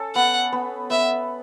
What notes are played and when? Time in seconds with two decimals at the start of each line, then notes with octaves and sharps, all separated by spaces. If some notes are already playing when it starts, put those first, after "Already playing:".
Already playing: C#4 A4
0.15 B3 F#5
0.52 B3
0.90 B3 E5